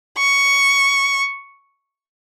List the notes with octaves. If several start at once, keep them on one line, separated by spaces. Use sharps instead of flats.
C#6